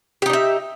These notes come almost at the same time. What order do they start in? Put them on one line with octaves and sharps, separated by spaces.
G4 D#4 D4 E5